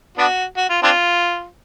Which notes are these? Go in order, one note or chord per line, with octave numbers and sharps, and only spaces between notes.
B3 D4 F#4
F#4
F4
C4 D4 F4